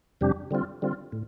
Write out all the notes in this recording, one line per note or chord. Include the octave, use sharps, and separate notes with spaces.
F2 C3 G3 D4 G4
D3 G3 C4 F4
D3 G3 C4 F4
A2